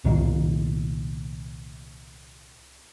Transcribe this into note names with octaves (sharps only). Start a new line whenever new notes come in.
C2 A#2 D#3